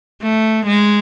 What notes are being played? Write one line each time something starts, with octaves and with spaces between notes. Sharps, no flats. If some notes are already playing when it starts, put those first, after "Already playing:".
A3
G#3